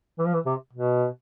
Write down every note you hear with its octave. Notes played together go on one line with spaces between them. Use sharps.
E3
F3
E3
C3
B2